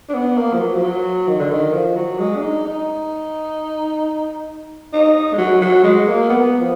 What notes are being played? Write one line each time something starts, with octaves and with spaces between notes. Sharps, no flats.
D4
B3
A#3
F3
F#3
F3
F#3
D#3
D3
D#3
F3
F#3
G#3
D4
D#4
D#4
D#4
G#3
F#3
F#3
G#3
A#3
B3
F3